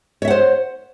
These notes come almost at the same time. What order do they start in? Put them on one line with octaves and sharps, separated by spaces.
C#5 E5 F#5 C5